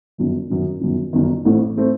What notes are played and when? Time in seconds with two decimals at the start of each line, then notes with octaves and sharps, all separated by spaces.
0.18 G1 F#2 D#3
0.50 G1 F#2 D#3
0.81 G1 F#2 D#3
1.13 G1 F#2 D#3
1.45 A1 A2 A3 C4
1.77 A2 A3 C4